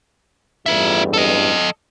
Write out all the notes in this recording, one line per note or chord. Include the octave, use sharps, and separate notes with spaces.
A1 E2 G2 F4 E5
A4 D#5